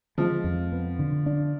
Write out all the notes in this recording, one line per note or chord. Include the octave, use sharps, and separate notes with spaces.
F3 G#3
F2
B3
D3
D4